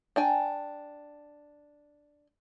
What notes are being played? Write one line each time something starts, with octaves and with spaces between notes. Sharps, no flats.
D4 G5 G#5